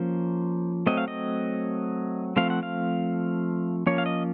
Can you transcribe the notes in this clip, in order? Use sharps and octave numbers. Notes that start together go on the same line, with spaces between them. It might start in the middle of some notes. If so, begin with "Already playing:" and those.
Already playing: F3 A#3 C#4 C5
F#3 A3 C4 D#5
F5
D#5
F3 A3 C4 F5
F#5
F5
F3 A#3 C#4 C#5
F5
D#5